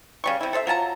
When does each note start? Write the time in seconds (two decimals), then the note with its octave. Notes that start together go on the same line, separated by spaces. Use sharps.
0.24 C#3 G3 C#6
0.41 C3 E4
0.53 A4 C5 D5 E5
0.67 F#3 F4 A5 A#5